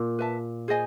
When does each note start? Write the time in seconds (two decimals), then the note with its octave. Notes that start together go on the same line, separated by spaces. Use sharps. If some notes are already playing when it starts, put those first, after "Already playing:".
Already playing: A#2
0.19 B4 E5 A5
0.68 G#4 C5 D#5 G#5